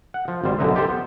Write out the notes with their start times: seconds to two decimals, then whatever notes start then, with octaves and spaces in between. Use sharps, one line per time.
0.14 F#5
0.28 F3
0.44 G#1 G3 C5 D5
0.59 B1 F#2 D3 D#4 B4 E5
0.74 F4 G4 A4 C5
0.88 B3